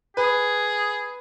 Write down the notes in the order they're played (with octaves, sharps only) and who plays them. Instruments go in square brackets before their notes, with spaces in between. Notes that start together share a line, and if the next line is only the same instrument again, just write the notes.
[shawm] G#4 [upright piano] B4